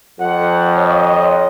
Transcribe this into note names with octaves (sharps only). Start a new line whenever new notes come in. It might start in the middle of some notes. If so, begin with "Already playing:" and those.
F2 F3 F#5
C#5 D#5